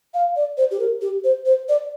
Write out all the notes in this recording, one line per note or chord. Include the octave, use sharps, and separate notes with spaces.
F5
D5
C5
G4
A#4
G4
C5
C5
D5